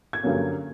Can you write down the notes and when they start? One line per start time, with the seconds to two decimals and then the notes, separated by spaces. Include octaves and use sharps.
0.13 G#6
0.23 G2 D3 F#3 A#3 C#4